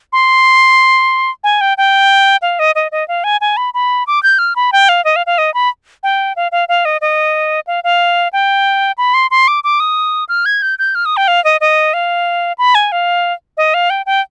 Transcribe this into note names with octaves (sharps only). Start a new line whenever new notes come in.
C6
G#5
G5
G5
F5
D#5
D#5
D#5
F5
G#5
G#5
B5
B5
D6
G6
F6
B5
G5
F5
D#5
F5
F5
D#5
B5
G5
F5
F5
F5
D#5
D#5
F5
F5
G5
B5
C6
C6
D6
D6
D#6
F6
G#6
G6
G6
F6
D#6
G5
F5
D#5
D#5
F5
B5
G#5
F5
D#5
F5
G5
G5